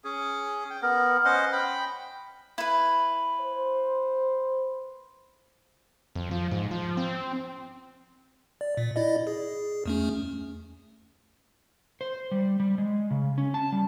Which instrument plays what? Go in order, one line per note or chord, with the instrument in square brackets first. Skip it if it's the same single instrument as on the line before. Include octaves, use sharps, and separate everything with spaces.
[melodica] C#4 G#4
G5
B3 A#4
C#4 C5 D#5 F#5
G5 B5
[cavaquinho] E4 B4
[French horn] C5
[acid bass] F2
F3
G#2
F3
C4
[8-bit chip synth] D5
A#2
E4 D5 D#5
G#4
E2 A3 C#4
[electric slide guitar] C5
G3
G3
G#3
C#3
C#4
A5
G3